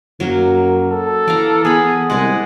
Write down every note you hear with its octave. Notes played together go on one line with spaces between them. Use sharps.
F#2 F#3 A#3
A4
E3 D5 F5 A#5
B3 G#4 B5
C2 G#3 G#4 D5 F#5